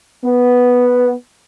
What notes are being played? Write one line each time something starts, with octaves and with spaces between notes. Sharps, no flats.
B3